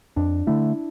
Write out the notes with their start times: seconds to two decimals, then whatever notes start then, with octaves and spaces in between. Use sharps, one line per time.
0.16 F2 D4
0.47 D3 A3 E4